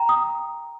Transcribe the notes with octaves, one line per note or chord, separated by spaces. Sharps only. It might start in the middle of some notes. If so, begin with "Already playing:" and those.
Already playing: G5 A#5
D#6